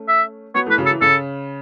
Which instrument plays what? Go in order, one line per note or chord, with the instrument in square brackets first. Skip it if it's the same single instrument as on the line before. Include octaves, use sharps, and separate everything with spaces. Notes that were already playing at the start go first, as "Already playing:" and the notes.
Already playing: [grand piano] A3 C#4
[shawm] E5
[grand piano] F#3 B3 [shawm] C#5
[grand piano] E3 A3 [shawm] B4
[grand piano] C#3 F#3
[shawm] A4
[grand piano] E3
[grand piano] C#3 [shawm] A4